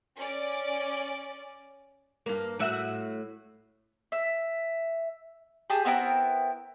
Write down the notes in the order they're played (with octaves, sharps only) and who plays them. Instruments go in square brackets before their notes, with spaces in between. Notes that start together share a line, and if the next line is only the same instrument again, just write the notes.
[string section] C#4 D5
[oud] G2 A#3
A2 F#4 E5
[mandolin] E5
G4 G#4 A5
B3 C4 E4 A#4